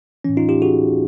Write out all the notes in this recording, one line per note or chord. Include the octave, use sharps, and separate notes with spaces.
A2 E3 C#4
D#4 F4
F4 G4
F#4 G#4